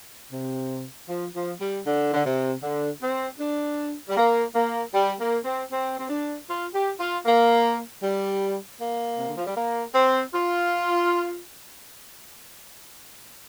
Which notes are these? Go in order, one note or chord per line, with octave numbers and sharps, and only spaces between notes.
C3
F3
F3
G3
D3
D3
C3
D3
C4
D4
G3
A#3
A#3
G3
A#3
C4
C4
C4
D4
F4
G4
F4
A#3
G3
A#3
C3
D3
F3
G3
A#3
C4
F4